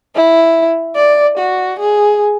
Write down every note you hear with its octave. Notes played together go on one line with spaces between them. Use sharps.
E4
D5
F#4
G#4